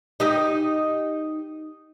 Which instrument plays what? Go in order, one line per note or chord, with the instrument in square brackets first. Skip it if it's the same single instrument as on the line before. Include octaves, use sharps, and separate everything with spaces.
[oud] D#4 G4 D#5